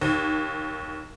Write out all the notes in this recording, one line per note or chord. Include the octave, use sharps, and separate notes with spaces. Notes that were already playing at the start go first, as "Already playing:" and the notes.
D#2